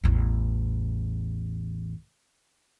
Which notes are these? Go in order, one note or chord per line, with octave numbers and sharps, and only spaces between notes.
A1 E2